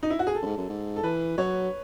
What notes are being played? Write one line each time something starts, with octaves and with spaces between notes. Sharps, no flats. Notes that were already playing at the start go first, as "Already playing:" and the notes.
D#4
E4
F#4
G#4
A4
F#2
G#2
F#2
G#2
A4
E3 B4
F#3 C#5